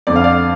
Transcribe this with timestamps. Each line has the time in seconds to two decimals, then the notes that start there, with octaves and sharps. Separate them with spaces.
0.07 F2 D3 D5
0.16 F5
0.24 D5